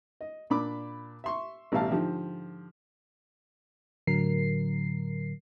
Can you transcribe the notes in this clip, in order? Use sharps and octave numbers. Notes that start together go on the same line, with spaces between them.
D#5
A#2 D4 B5 D6
E5 C6 C#6
A1 B2 G3 E5 F5 A5
G#2 D3 F3 G4
A2 D3 F#3 A#4 C7